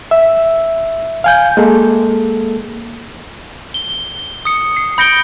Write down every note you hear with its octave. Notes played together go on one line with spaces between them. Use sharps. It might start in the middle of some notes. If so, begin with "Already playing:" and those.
E5
F5 G#5 G6
G#3 A#3 A4
G7
D#6 C#7
C7
B5 G6 A#6 C#7 D7 G7